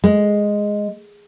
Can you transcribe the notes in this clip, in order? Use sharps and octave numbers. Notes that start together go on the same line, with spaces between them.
G#3